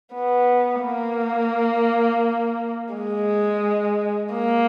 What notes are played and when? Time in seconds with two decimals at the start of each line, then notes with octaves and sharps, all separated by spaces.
0.14 B3
0.83 A#3
2.93 G#3
4.34 A#3